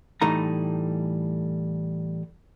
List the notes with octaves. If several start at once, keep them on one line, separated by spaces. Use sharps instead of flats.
A2 E3 G3 A3 D#4 A#5